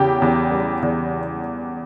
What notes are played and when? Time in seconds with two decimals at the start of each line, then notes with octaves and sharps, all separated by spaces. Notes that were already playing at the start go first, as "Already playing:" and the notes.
Already playing: E2 C#3 G4
0.22 E2
0.52 G3
0.82 E2